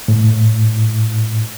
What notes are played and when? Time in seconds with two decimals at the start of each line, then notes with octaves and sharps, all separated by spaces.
0.08 A2